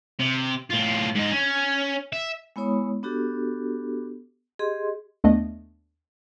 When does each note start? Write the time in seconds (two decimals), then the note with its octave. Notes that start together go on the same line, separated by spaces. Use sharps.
0.20 C3
0.71 A2 F4
1.15 G#2 D#4
1.31 C#4
2.13 E5
2.56 G#3 B3 E4 C#5 B5 D#6
3.03 B3 D4 F#4 G4 A4
4.59 G4 G#4 D#5 C6
5.24 D#2 A3 B3 D4 D#5